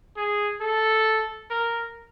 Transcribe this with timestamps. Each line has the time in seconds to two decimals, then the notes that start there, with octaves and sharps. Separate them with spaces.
0.16 G#4
0.61 A4
1.50 A#4